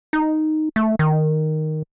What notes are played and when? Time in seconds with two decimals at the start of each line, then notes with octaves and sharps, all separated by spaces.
0.13 D#4
0.76 A3
0.99 D#3